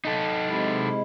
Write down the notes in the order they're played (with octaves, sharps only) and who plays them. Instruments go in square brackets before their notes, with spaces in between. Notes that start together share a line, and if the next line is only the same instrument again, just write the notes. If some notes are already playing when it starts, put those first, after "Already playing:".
[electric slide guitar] D#4 A4
[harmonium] C3 G#3 E4